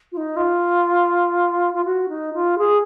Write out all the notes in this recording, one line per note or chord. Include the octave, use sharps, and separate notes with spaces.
F4
D#4
F4
F4
F#4
D#4
F4
G#4